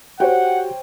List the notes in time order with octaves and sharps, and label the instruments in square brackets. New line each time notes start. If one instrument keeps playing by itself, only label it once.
[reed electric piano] F#4 G4 [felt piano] C5 C#5 G5 [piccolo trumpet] F#5